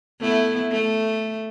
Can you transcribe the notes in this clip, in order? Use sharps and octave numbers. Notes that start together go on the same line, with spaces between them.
A3 B3 E4
A3